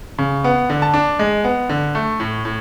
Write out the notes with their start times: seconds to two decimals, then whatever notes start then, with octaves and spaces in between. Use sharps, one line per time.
0.18 C#3
0.44 B3
0.70 D3
0.82 A5
0.94 D4
1.19 G#3
1.44 B3
1.69 D3
1.95 A3
2.20 A2
2.45 A2